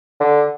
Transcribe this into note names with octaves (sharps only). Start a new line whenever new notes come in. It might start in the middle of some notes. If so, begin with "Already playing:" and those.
D3